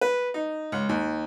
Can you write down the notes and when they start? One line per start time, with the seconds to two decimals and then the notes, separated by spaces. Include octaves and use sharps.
0.01 B4
0.34 D#4
0.72 C#2
0.89 D#2